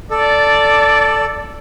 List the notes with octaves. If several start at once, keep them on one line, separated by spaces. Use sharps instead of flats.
A4 D5